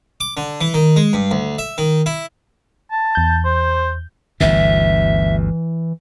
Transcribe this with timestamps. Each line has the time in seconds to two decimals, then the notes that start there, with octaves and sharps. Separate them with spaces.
0.20 D6
0.37 D3
0.61 E3
0.74 D#3
0.96 G#3
1.13 G2
1.31 D2
1.58 E5
1.78 D#3
2.06 E4
2.91 A5
3.15 E2 G6
3.45 C5
4.41 G1 D2 B2 E3 E5